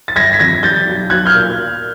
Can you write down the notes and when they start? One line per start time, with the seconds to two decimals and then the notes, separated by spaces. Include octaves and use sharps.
0.08 A6
0.16 G1 G#6 A#6
0.33 B6
0.39 F2 G#6 A#6
0.63 G3 G6 A6
0.87 B1
1.10 B1 F#6 G#6
1.25 F6 G6
1.34 A#2